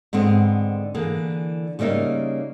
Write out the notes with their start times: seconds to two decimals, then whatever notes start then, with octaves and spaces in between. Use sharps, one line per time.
0.13 G#2 D3 B3 C4 G#4
0.95 D3 E3 A#3 G#4
1.79 C#3 G3 A#3 D#4 E5